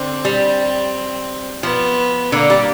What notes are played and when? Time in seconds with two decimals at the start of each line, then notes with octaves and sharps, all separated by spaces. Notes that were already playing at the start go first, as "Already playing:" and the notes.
Already playing: D3 C4
0.25 G3
1.63 F3 B3
2.32 D3 A#3
2.50 G3